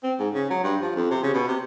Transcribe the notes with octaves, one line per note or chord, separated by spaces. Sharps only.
C4
G#2
C#3
F#3
G2
F3
F2
C3
C#3
B2
C3